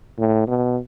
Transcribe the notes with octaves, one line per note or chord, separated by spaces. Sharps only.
A2
B2